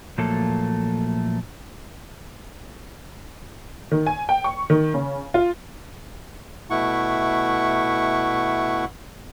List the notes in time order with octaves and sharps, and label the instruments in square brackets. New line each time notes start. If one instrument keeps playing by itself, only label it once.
[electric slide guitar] A#2 F3 F#3 A3 A#3 A4
[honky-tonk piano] D#3
G#5
G5
C#6
D#3
C#3
F4
[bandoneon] B2 A3 E4 F#5 C#6